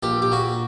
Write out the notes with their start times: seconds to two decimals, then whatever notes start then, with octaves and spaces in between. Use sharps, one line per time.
0.03 A#1 G4
0.22 G4
0.32 A#2 F#4